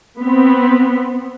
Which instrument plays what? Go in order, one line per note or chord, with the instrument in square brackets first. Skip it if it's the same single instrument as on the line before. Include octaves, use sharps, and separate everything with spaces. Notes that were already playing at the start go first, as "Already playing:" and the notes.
[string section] B3 C4